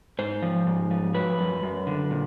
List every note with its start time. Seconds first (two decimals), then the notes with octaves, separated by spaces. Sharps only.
0.19 G#2 C5
0.42 F3
0.67 G#2
0.91 F3
1.14 F#3 B4
1.39 F#2
1.63 F#2
1.87 D3
2.11 A#2